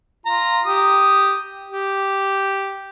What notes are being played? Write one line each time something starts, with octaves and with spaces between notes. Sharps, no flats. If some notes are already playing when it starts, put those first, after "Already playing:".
F4 A#5
G4 D#6
G4